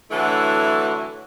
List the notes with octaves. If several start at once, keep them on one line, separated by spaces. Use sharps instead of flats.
D3 E3 F#3 A3 E4